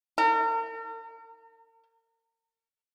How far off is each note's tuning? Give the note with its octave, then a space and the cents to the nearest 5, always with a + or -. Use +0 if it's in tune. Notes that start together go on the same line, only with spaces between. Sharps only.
A#4 -40